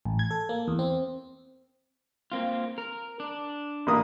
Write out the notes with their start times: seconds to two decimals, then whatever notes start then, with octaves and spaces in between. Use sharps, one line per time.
0.05 A1
0.19 G#6
0.31 A4
0.49 A#3
0.68 E2
0.79 C4
2.32 A#3 C4 F4
2.78 A#4
3.20 D4
3.87 A1 A#3 D#6